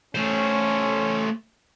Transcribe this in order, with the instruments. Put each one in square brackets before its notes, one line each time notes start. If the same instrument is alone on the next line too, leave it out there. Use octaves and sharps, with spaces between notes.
[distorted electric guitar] A3 C5 [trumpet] C#4